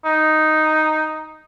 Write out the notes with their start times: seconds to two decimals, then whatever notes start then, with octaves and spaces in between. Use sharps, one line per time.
0.05 D#4